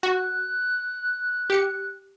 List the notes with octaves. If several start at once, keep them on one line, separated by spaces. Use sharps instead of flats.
F#4 F#6
G4 C#7